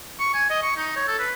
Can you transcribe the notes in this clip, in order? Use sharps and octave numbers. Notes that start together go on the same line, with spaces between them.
C#6
G#5
D#5
C#6
D#4
C#5
A4
B4